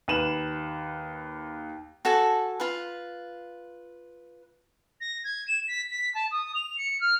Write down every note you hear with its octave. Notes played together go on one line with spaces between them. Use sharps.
D#2 B4 E7 F#7
F#4 A4 G#5 A5
F4 B4
A#6
G#6
E7
B6
B6
A5
D#6
F7
C#7
F6